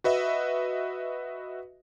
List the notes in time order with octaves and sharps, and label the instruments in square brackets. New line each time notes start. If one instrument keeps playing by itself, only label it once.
[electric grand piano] F#4 B4 D#5 E5